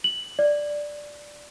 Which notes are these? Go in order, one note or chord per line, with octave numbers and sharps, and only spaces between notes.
F#7
D5